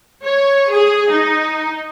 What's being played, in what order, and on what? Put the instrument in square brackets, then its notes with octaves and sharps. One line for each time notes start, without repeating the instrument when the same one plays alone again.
[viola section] C#5
G#4
D#4